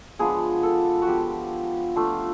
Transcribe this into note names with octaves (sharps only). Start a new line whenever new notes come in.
F3 G#3 B3 D4 G#4
A4
F#4
F3 G#3 B3 D4 G4
A3 D4 F4